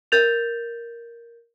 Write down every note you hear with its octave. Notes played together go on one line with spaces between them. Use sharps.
A#4 G6 A6 F7